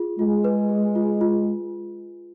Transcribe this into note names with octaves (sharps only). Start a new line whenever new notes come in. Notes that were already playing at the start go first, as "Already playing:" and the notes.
Already playing: F4 G#4
G#3 F4
B4
G#4
F4
F4